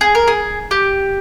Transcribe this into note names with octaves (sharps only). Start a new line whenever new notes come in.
G#4
A#4
G#4
G4